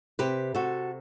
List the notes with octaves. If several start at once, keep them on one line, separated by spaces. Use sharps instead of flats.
C3 G4 B4
C3 F#4 A4